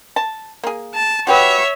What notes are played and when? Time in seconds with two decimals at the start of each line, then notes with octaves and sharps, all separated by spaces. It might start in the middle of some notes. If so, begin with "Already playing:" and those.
0.16 A5
0.63 A#3 G#4
0.95 A5
1.27 F#4 G4 B4 C#5 E5